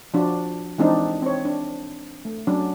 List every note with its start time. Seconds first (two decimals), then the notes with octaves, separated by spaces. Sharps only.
0.14 F3 D4 F4 F#4
0.78 E3 G#3 C4 D4 D#4
1.22 C4 C#5
1.45 D4
2.25 A3
2.47 F#3 C#4 D4